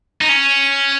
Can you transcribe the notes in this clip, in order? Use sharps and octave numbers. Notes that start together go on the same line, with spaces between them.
D#4
C#4